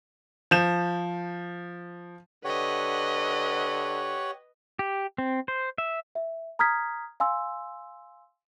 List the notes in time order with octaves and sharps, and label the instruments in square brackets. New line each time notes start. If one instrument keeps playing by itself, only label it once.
[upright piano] F3 G6 E7
[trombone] D3 [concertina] G4 C#5 F#5 [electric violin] B4 D#5
[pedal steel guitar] G4
C4
C5
E5
[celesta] E5
A#5 D#6 F6 G#6 B6
F5 G#5 C6 E6